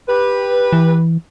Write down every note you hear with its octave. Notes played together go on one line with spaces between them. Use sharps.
G4 B4
E3